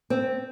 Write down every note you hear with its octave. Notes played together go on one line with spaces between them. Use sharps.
C4